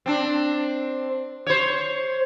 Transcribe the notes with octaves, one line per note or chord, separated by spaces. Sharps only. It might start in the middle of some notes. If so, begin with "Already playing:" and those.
C4 D4
C5 C#5